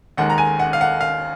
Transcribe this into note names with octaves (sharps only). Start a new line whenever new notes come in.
D#2 D#3 G#3 F#5
A#5
G#5
F#5
F5
F#5
F5